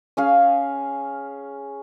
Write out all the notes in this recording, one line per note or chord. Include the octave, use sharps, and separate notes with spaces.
C#4 G#4 F5